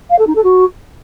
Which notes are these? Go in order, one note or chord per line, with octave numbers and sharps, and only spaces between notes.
F5
A4
D#4
A4
F#4